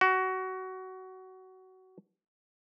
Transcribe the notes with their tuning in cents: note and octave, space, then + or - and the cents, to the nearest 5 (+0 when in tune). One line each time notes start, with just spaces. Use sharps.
F#4 +20